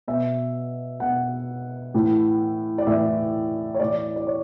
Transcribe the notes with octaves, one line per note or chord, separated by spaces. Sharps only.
B2 E5
B2 F#5
A2 E3
D5
A2 E3 E5
C#5
A2 E3 D5
D5
C#5